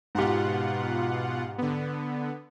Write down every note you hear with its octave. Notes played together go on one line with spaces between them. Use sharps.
G#2 B2 F4 G4 F#5
D3 B3